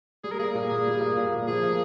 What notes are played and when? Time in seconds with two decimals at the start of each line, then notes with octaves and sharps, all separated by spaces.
0.24 G3 G#4
0.31 A#4
0.39 A#3 G#4
0.55 A#2
0.71 A#2
0.86 G3
1.01 A#3
1.17 A#2
1.32 A#2
1.48 F3 G#4
1.63 A#3